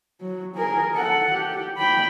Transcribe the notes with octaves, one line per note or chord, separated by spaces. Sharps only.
F#3
G#4 A#4
A4 F#5
G4
G5 B5